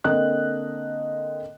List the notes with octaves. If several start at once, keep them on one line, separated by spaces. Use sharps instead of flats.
D3 A#3 C4 D#5 F#6